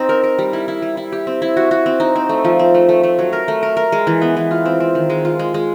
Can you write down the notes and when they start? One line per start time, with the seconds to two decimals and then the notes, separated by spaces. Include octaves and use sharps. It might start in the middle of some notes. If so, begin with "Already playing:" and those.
Already playing: C4 D#4
0.09 A#4
0.24 A#4
0.39 G3
0.53 E4
0.68 E4
0.82 G3
0.97 E4
1.12 G4
1.27 C4
1.42 E4
1.57 F#4
1.71 F#4
1.86 C4
2.00 D#4
2.16 C4
2.29 A3
2.44 F3
2.59 C4
2.74 A3
2.89 A3
3.03 A3
3.19 F#3
3.33 A#4
3.48 A3
3.63 A#4
3.77 A#4
3.92 G#3
4.07 E3
4.21 B3
4.37 E3
4.51 F4
4.66 C4
4.80 C4
4.95 D#3
5.10 G#3
5.25 F4
5.39 G#3
5.54 G#3